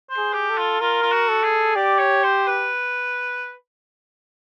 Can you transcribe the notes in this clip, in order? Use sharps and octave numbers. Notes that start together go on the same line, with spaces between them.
C5
G#4
G4
A4
F4
F4 A#4
F4
F#4
A4
G#4
G4 D5
C#5
C5
B4